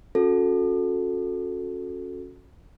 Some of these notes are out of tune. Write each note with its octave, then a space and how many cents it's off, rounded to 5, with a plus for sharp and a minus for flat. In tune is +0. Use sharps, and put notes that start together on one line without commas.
C#4 -10 F#4 -20 A4 +0